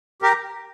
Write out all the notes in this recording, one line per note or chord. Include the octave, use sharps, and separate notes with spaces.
G4 A#4